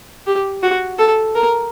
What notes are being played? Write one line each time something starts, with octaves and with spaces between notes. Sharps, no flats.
G4
F#4
A4
A#4